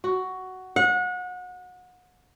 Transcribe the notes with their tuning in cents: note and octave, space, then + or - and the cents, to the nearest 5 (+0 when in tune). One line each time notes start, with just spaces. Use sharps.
F#4 +10
F#5 -30